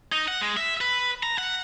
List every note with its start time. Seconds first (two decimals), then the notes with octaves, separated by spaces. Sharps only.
0.12 D#4
0.28 F#5
0.41 G#3
0.57 E5
0.81 B4
1.23 A#5
1.38 F#5